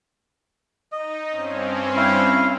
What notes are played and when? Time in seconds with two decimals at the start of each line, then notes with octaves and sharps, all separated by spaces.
0.92 D#4 D#5
1.30 G2 C4 C#4
1.96 E4 F5